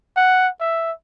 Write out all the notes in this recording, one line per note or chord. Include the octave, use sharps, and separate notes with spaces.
F#5
E5